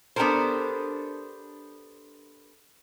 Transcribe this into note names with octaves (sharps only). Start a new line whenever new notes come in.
B3 D4 G4 A4 A#4 C5